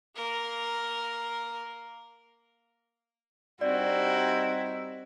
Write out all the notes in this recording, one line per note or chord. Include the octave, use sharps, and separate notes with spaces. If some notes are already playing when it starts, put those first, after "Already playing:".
A#3 A#4
G2 G3 C4 D#4 E4 F#4 D5